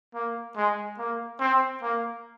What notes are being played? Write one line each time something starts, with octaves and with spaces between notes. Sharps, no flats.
A#3
G#3
A#3
C4
A#3